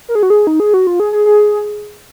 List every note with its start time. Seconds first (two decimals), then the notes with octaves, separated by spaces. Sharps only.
0.09 A#4
0.15 G#4
0.23 F#4
0.30 G#4
0.47 D#4
0.60 G#4
0.74 F#4
0.87 F4
1.00 G#4
1.13 G#4
1.26 G#4